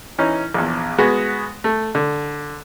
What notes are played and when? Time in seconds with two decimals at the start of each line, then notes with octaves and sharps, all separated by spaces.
0.18 E3 C#4 D#4
0.54 A#1 E2
0.98 G#3 B3 F#4 G#4
1.64 A3
1.95 D3